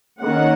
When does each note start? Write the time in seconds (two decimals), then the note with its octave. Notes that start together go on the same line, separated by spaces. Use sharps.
0.21 D#3 A#3 C#4 F#5